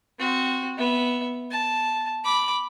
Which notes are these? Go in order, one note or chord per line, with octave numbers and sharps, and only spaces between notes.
C4 F#4
B3 E5
A5
B5 D6